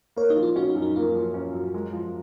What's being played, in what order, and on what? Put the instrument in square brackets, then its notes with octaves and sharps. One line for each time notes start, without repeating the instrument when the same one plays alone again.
[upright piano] A#3 [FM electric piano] A#4 C#5
[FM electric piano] D#4
[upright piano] F3
[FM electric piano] F4
[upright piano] C#4 [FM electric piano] D#4 F#4
[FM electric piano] D#4
[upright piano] F#2
[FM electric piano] D#4
[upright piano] A#3 [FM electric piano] F4
[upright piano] F3
C#4
F#2
G#3
F3